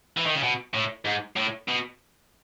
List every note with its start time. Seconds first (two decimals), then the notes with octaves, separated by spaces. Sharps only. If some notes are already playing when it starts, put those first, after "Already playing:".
0.17 E3
0.26 D#3
0.35 C#3
0.43 B2
0.74 A2
1.05 G#2
1.37 A2
1.68 B2